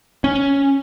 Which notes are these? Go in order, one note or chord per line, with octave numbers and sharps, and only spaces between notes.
C#4